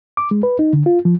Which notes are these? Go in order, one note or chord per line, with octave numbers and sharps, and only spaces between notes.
D6
G#3
B4
D#4
D3
F4
F3